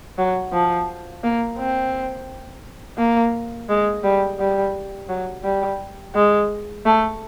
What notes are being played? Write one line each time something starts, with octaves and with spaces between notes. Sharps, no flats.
F#3
F3
A#3
C4
A#3
G#3
G3
G3
F#3
G3
G#3
A3